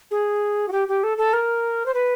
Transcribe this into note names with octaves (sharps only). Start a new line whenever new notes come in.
G#4
F#4
G4
G4
A4
A4
A#4
C5
B4